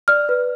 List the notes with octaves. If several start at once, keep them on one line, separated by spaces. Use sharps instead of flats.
D5 F6
B4